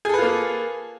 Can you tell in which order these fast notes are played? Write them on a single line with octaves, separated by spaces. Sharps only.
G#4 A4 B4 F4 A#3